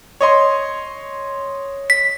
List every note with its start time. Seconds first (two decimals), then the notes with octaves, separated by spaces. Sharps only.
0.21 C#5 D#5 C6
1.90 B6